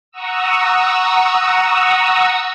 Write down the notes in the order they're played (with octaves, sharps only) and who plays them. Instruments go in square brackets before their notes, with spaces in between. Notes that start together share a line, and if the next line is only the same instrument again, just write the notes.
[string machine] F#5 A#5 C#6 D#6 E6